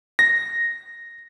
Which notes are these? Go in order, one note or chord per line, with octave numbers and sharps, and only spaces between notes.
A#6